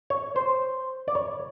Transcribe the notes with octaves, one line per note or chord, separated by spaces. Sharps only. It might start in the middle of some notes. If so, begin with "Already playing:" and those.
C#5
C5
D5
C#5